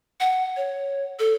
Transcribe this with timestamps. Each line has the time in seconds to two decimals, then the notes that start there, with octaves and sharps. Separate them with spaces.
0.20 F#5
0.57 C#5
1.19 A4